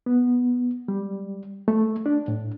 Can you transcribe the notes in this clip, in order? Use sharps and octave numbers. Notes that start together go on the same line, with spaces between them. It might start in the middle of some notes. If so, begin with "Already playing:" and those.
B3
G3
A3
D4
A2